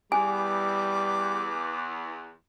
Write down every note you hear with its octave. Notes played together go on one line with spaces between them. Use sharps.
E2 G3 G#5 D6